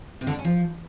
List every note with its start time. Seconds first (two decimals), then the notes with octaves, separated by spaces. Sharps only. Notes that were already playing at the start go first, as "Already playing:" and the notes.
0.21 C3
0.27 D3
0.33 D4
0.39 C#4
0.45 F3